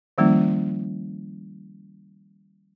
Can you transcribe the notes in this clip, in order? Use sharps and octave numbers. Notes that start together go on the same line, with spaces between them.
D#3 F3 G3 A#3 C#4 E4